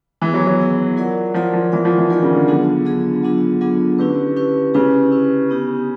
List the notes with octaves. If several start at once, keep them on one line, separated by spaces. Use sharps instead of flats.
E3 B3 E4 G#4
F#3
F#3
B3 E4 G#4
F4 A#4 D5 F#5
F3 F4 A#4 D5 F#5
F3
E3 F4 A#4 D5 F#5
F3
E3
D#3 F4 A#4 D5 F#5
C#3
D3
D3 F#3 B3 D4 F4 G#4
F#3 B3 D4 F4 G#4
F#3 B3 D4 F4 G#4
F#3 B3 D4 F4 G#4
D3 C#4 E4 G4 B4
C#4 E4 G4 B4
C#3 C#4 E4 G4 B4
C#4 E4 G4 B4
B3 D#4 G4